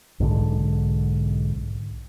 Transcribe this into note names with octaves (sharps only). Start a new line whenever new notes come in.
B1 G#2 D3